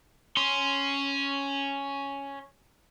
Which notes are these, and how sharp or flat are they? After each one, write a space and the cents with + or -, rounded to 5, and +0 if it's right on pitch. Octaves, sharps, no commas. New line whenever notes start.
C#4 +0 C6 +0